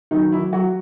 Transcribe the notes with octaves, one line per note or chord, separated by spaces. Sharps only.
D#3 F#3 D#4
E3 E4
F#3 F#4